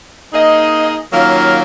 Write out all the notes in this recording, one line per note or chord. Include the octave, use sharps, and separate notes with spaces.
A#3 D#4 G#4 D#5
D#3 F#3 A#3 C#4 F4